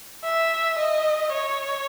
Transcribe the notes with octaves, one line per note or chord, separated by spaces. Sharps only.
E5
D#5
C#5